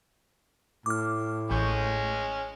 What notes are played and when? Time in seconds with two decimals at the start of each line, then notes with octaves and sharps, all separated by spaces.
0.86 A2 D6 F6
1.51 A1 G#3 C#4 C#6 G6